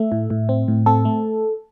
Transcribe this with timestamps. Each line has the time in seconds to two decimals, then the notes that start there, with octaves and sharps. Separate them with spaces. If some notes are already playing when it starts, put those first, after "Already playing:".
Already playing: A3 E5
0.12 A2
0.30 A2
0.49 C4
0.68 A2
0.86 C4 A4
1.05 A3